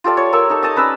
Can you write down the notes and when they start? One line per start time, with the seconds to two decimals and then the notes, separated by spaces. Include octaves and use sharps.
0.04 F4 G4 A4 D5
0.17 C#5
0.32 A#3 A#4 C#6 E6
0.50 D#4 A4
0.63 D#5 A5 A#5 D#6
0.76 C#4 B4 D5 E6